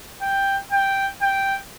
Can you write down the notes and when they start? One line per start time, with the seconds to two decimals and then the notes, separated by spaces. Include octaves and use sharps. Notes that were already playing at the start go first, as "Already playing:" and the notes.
0.22 G5
0.72 G5
1.22 G5